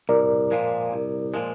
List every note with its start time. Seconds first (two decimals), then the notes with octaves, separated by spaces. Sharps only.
0.09 C2 A#4 D5
0.51 A#2 F3 G#3
0.92 C2
1.34 A#2 F3 G#3